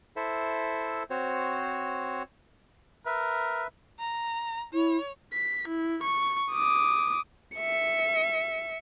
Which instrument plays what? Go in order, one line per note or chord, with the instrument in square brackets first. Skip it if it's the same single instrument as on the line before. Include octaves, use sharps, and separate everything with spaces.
[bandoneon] E4 A4 C5 E5
C4 F#4 C5 C#5
[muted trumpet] A#4 [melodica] B4 E5
[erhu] A#5
[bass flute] E4 [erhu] C#5
[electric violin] B6
E4
C#6
D6 D#6
E5 C#7